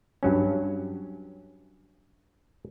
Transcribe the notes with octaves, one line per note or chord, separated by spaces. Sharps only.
G2 F#3 C#4